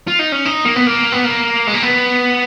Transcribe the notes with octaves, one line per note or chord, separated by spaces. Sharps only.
F4
D#4
C#4
D#4
A#3
B3
A#3
B3
A#3
G#3
A#3
B3